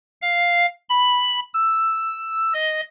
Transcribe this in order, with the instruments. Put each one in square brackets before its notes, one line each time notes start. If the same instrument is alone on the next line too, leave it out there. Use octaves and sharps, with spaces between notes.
[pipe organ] F5
B5
E6
D#5